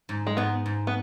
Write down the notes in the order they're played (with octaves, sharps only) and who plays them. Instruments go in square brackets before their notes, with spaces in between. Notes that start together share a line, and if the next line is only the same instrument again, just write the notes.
[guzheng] G#2
[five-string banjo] G#3
[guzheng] G#2 [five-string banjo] B3
[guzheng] G#2
[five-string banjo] B3